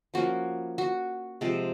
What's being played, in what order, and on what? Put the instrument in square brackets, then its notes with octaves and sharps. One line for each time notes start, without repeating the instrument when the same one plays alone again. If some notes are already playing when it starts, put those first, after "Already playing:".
[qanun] F3 A#3 C#4 F#4
F#4
C3 F3 G#3 C4